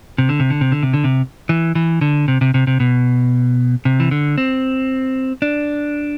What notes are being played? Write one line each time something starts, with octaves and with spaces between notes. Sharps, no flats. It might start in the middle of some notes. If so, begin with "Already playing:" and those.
C3
D3
C3
D3
C3
D3
C3
D3
C3
E3
E3
D3
C3
C3
C3
C3
B2
C3
E3
D3
C4
D4